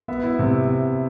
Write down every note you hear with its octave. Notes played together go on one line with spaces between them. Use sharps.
B3 E5
E4
C3